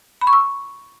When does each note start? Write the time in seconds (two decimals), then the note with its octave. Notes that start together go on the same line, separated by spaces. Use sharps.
0.21 B5
0.27 C#6
0.33 E6